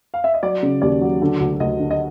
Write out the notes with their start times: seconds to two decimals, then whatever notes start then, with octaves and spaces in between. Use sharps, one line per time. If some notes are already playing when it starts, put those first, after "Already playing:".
0.14 F5
0.24 E5
0.34 D#5
0.43 F#3 D5
0.63 C#3
0.82 D#2 D5
1.01 F#3
1.22 D3
1.40 D2
1.60 D2 D#5
1.79 D3
1.91 D#5